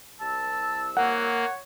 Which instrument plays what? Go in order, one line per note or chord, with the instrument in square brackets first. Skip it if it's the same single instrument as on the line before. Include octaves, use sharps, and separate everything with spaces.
[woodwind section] C2 E6 [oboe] A5
[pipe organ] A#3 [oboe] C#5 [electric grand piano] F#5